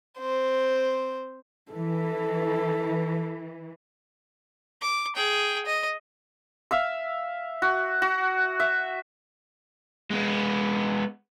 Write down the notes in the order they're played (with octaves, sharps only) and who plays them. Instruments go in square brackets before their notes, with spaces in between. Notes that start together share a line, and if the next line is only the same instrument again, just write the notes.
[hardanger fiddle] C4 C5
[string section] E3 [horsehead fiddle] A4
[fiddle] D6
G#4 G5
D#5
[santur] E5 F5 E6
F#4
F#4
E5
[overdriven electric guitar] G#3 B3